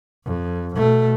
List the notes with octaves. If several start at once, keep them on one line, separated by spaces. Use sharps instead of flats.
F2
B2 A3